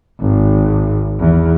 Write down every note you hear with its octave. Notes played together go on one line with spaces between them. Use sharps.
G#1
E2